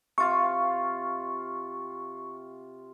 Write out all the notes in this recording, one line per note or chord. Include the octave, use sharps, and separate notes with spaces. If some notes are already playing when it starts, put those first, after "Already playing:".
C3 F4 F5 C#6